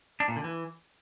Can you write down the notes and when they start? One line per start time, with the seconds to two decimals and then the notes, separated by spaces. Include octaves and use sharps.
0.20 D4
0.28 A#2
0.36 D3
0.44 E3